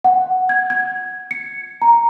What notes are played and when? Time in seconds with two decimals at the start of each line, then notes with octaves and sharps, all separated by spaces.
0.04 F#5
0.49 G#6
0.70 G#6
1.31 C#7
1.82 A#5